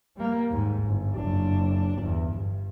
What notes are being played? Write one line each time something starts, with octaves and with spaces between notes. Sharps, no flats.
G3 A#3
D#2 G#2
G1
F#1 D4
G1 E2
G2